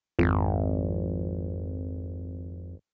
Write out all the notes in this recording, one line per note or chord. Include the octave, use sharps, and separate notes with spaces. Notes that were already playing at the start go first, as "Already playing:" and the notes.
G#1 F2